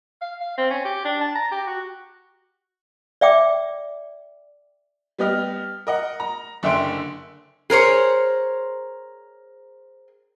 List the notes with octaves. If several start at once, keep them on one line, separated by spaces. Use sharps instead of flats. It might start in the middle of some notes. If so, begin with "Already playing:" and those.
F5
F5
C4
C#4
G4
D4
A5
A#5
G4
F#4
D5 E5 G5 D6
G3 B3 G4 D#5 F6
A#4 D#5 F#5
A#5
F#1 D3 E5 G5 C6 D7
G#4 A#4 C5 C#5